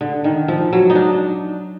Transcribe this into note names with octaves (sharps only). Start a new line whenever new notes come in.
D3
D#3
F3
F#3
D#4
D4